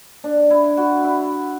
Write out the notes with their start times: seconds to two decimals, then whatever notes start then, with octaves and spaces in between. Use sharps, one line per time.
0.24 D4
0.50 E4
0.77 F#4
1.04 E4